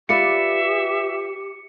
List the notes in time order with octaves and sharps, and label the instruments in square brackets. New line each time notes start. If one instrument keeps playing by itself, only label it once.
[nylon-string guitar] F4 B4 D5 [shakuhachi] G4 [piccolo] E5 [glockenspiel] C#7